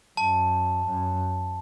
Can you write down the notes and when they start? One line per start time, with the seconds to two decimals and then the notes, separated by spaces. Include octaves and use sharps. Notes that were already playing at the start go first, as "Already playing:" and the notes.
0.17 F#2 A5
0.86 F#2